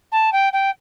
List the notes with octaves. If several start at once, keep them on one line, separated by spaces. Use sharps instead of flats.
A5
G5
G5